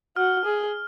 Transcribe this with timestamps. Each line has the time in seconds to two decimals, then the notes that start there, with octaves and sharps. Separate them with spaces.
0.16 F#4 F6
0.45 G#4